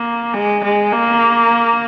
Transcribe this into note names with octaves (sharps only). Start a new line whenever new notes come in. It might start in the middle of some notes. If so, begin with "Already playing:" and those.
Already playing: A#3
G#3
G#3
A#3